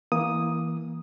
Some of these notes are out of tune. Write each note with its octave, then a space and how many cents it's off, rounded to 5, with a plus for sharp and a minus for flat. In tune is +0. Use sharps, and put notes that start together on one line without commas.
E3 -5 A#3 +15 D#6 +0